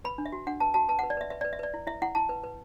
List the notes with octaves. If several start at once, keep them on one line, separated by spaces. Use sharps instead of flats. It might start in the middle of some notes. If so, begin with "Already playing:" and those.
B4 B5
D4
E5
F#4
D4 F#5
B4 A5
F#4 A5
B4 A5
F#5
B4
D5
B4 E5
B4 E5
D5
B4
E5
B4 D5
E4
E4 E5
E4 F#5
E4 A5
B4
B4